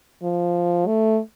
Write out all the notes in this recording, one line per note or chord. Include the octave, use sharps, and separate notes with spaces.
F3
A3